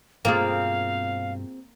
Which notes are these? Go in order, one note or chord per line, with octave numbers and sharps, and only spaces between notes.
G2 B2 A#3 C4 F4 G#4 F5